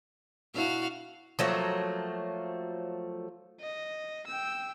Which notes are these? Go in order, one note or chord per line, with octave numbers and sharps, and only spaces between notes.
B2 D4 E4 F#4 F5
F3 F#3 A3 A#3
D#5
G5 E6